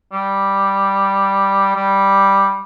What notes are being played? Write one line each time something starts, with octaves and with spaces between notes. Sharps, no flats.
G3
G3